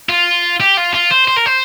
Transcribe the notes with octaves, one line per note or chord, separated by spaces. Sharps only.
F4
G4
F4
F4
C5
C5
A#4
C5